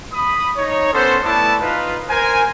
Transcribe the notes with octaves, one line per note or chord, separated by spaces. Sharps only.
B5 D#6
D#4 C#5
B3 C#4 A4 C5
A3 B3 E4 D5 A5
D#4 F4 B4
A#4 C5 G#5